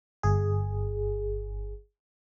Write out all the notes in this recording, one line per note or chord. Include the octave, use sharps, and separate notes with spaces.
G1 G#4